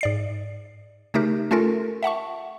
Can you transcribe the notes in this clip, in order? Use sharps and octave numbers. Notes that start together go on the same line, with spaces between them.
G#2 D5 C7
C#3 A3 D#4 G4 A#4
A3 C#4 F4 A4 A#4
E5 F#5 A5 C#6